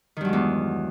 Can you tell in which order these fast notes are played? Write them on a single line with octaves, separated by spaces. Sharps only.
D#3 G2 F#3 G#3 E2